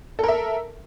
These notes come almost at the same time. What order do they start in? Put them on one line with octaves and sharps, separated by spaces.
A4 A#4 E5